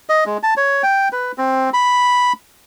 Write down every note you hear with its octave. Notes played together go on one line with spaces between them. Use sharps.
D#5
G#3
A5
C#5
G5
B4
C4
B5